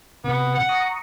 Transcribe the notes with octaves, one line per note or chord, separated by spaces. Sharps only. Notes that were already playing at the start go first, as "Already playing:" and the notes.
C3 B3
F#5
A#5 C#6 D#6